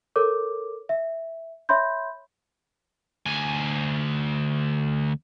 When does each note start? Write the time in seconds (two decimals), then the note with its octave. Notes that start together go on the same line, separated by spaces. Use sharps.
0.16 A4 A#4 C#5 D6
0.89 E5
1.69 C#5 E5 B5 C6 G6
3.26 D2 G#5